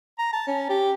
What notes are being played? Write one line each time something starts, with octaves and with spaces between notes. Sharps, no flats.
A#5
A5
C#4
G4